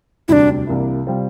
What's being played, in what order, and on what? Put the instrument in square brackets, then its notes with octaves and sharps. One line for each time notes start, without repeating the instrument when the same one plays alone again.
[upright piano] E1 D2 C3 G3 [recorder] D4 E4
[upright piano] C2 C3 E3 A#3 E4
C3 G3 C4 F4